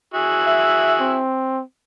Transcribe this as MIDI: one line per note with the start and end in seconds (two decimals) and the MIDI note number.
0.14 1.21 64
0.14 1.21 66
0.14 1.21 68
0.46 0.93 76
1.00 1.63 60